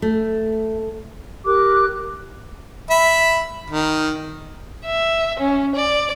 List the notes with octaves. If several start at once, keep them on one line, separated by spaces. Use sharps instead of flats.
A3
G4 A#4 D6 F#6
E5 B5
D#3
E5
C#4
D5